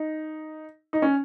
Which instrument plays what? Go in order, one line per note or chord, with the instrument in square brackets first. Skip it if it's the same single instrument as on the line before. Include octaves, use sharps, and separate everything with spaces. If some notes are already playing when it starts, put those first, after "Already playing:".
Already playing: [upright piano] D#4
D#4
C#4